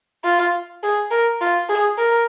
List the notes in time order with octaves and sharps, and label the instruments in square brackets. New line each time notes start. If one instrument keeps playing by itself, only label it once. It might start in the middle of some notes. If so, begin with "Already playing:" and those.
[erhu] F4
G#4
A#4
F4
G#4
A#4